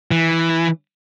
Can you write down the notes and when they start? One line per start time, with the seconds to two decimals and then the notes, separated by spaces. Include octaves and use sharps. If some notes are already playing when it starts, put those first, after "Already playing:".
0.11 E3